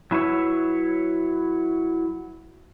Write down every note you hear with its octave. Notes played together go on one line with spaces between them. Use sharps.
F#3 E4 B4 C#5